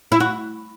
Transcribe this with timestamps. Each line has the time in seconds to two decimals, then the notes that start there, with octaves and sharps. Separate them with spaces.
0.12 E4
0.20 F#4